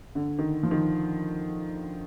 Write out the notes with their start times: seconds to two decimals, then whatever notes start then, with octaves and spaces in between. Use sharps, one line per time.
0.15 D3
0.39 D#3
0.63 F3
0.71 D#3